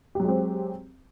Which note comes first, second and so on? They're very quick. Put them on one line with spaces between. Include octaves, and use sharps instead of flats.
G4 F#3 G#3 C4